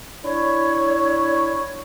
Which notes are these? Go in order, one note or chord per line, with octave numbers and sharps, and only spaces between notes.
D4 E4 C#5